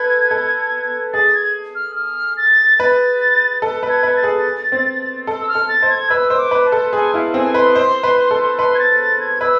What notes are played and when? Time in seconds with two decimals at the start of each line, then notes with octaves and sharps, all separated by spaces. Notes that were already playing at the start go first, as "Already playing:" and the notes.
Already playing: A4 B4 G#6
0.31 A4
1.13 G#4 A6
1.35 G#6
1.75 F6
1.96 F6
2.37 A6
2.79 B4 A6
3.62 A4
3.83 B4
3.89 G#6
4.03 B4
4.17 A6
4.23 G#4
4.72 C4
5.27 A4
5.41 E6
5.49 F6
5.55 A4
5.69 A6
5.82 C5
5.90 G#6
6.10 B4 E6
6.30 C5
6.37 D6
6.51 B4
6.66 A5
6.72 A4
6.93 G#4 G#5
7.14 E4 F5
7.34 C4 G#5
7.54 B4 C6
7.75 C5
8.03 B4
8.31 A4
8.58 B4 C6
8.75 G#6
8.79 A6
9.00 A6
9.16 A6
9.20 G#6
9.41 B4 E6